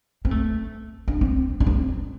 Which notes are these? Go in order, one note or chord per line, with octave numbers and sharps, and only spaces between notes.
C4
A3
D4
C4
D4
C4